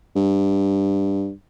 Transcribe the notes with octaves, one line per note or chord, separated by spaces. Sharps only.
G2